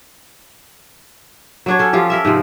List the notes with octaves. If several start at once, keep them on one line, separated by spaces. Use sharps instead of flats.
F#3 D4 C#5
C#4 A4
F3 F4 G4
A4 A#4 E5
G#2 C3 F3